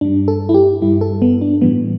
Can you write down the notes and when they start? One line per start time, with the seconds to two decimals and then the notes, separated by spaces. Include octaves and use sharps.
0.01 G2 G3 D4
0.28 A4
0.49 E4
0.54 G4
0.82 G2 G3 E4
1.01 A4
1.22 B3
1.41 D4
1.61 A2 E3 G3 B3